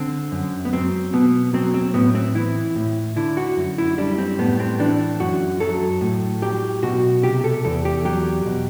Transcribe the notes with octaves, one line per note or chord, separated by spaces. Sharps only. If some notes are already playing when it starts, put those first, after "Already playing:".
Already playing: D3 C4
F#2
B3
F#3 C4
B2 B3
F#3 C4
C4
A2 B3
C4
E3 E4
A2
D3 E4
F#4
F#2
E4
G3 D4
C4
A2 B3
C4
E3 D4
F#2 F#4
F#3 A4
A2
F#3 G4
B2 F#4
C3 G4
A4
E2 A4
G4
F#3 G4
B2